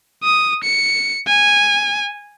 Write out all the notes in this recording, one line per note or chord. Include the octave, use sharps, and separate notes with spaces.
D#6
C#7
G#5